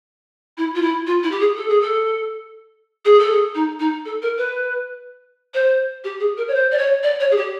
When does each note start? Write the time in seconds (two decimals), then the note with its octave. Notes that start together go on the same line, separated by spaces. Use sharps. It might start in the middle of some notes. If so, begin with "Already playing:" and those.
0.58 E4
0.75 F4
0.82 E4
1.07 F4
1.23 E4
1.32 G4
1.40 G#4
1.57 A4
1.69 G#4
1.81 A4
3.05 G#4
3.19 A4
3.32 G#4
3.55 D#4
3.80 D#4
4.05 A4
4.22 A#4
4.38 B4
5.54 C5
6.04 G4
6.20 G#4
6.37 A#4
6.48 C#5
6.54 C5
6.72 D5
6.78 C#5
7.03 D5
7.20 C#5
7.31 G#4
7.37 G4